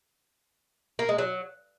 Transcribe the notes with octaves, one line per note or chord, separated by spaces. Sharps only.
A#3
G#3
F#3